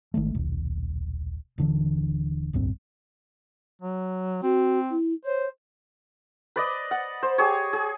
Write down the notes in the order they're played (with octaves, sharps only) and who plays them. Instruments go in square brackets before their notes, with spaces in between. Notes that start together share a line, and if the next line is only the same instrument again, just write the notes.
[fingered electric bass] G#1 D#3 G#3 A3
D#1 B1
D#1 D3 E3
D1 B1 G2 C4
[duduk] F#3
[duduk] C4 [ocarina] F#4
[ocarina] E4
[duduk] C5 [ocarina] C#5
[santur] B4 D5 D#5
F#5
C5
G4 G#4 C#5
G#4